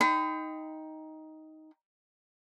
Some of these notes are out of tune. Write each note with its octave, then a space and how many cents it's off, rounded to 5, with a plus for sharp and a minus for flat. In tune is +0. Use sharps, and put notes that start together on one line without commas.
D#4 +10 G5 +5 B5 +45